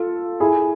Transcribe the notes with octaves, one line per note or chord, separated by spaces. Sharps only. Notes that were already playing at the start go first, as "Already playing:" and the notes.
Already playing: F4 A4
E4 G#4